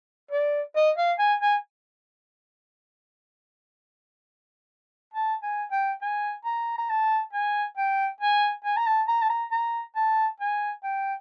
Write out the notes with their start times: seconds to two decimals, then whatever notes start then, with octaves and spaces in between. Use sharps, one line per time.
0.31 D5
0.76 D#5
0.98 F5
1.19 G#5
1.41 G#5
5.14 A5
5.43 G#5
5.72 G5
6.02 G#5
6.45 A#5
6.78 A#5
6.89 A5
7.33 G#5
7.77 G5
8.21 G#5
8.64 G#5
8.77 A#5
8.87 A5
9.08 A#5
9.22 A5
9.30 A#5
9.52 A#5
9.96 A5
10.40 G#5
10.83 G5